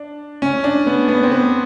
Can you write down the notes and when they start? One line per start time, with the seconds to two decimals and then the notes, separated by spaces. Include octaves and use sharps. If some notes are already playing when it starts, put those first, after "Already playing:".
Already playing: D4
0.42 C#4
0.64 D4
0.87 B3
1.09 B3
1.23 C4
1.31 B3